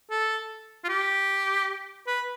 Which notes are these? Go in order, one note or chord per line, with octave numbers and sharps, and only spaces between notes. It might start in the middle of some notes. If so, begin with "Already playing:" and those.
A4
F4
G4
B4